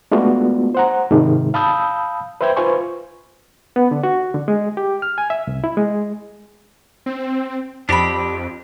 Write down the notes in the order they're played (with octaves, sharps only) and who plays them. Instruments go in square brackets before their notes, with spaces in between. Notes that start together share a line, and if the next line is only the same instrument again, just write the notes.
[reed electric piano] G#3 A3 B3 D4 F4 F#4
C5 F#5 A#5
G#2 C3 D#3 G#3
F5 A5 B5 D#6 E6 G6
B4 C5 E5 G5 G6 G#6
F4 B4 C5 G#5 C#6
B3
D3
F#4
D3
G#3
G4
F6
G#5
E5
C2
E4
G#3
[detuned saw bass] C4
[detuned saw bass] F2 [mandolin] C4 D#5 B5 [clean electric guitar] D4 G4